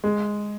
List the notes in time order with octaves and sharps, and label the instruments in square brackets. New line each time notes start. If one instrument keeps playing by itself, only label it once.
[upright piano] G#3